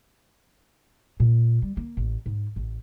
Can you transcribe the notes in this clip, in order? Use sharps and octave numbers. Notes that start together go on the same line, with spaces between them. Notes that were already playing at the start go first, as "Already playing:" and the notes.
A#2
G3
A#3
A1
G#2
A1